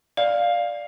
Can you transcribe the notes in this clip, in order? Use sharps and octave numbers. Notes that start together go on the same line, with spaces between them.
D5 F5